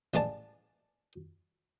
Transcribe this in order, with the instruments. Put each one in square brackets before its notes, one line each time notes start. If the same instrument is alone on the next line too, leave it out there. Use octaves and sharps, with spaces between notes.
[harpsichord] A1 E3 G#3 D5 A5